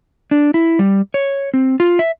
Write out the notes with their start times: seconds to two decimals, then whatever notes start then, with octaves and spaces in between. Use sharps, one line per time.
0.31 D4
0.54 E4
0.79 G3
1.14 C#5
1.54 C4
1.80 F4
1.99 E5